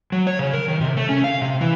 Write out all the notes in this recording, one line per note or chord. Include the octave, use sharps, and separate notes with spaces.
F#3
C#5
C#3
A#4
D#3
C3
A3
C#4
F5
C3
E3